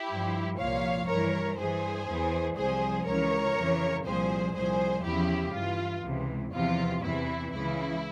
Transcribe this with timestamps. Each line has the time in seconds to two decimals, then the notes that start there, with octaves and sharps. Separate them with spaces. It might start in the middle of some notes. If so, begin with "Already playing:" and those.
Already playing: E4 G4
0.10 G2 F3
0.59 C2 A#2 F3 C#5 F5
1.08 G2 E3 A#4 C#5
1.58 G2 E3 G#4 C5
2.08 E2 E3
2.57 C2 C3 F3 G#4 C5
3.07 C#2 C#3 E3 A#4 C#5
3.56 F2 C#3 E3
4.05 C2 A#2 F3 G#4 C5
4.55 C2 A#2 F3 G#4 C5
5.04 E2 C#3 F3 E4 G4
5.54 G2 E3 F4
6.04 C#2 C3 E3
6.53 E2 C3 F3 F4
7.03 E2 C3 E3 E4
7.52 C#2 C#3 E3 E4